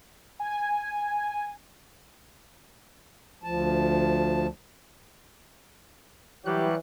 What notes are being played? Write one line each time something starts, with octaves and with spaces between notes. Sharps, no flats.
G#5
D2 F3 A5
E3 F#3 G3 G4 F#6